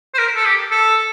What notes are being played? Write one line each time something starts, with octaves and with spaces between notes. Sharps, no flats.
C5
A#4
A4
G4
A4